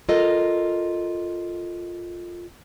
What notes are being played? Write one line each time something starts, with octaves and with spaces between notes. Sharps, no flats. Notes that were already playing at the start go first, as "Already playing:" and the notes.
F4 A4 A#4 D#5